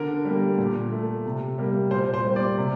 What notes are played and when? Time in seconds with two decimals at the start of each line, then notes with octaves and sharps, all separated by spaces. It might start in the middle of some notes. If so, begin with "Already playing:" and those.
Already playing: D3 A#4
0.25 G3 A#3
0.58 A#2
0.92 A3
1.25 C3
1.58 G3 A#3
1.91 A#2 C5
2.14 C5
2.24 G3 A#3
2.36 D5
2.58 C3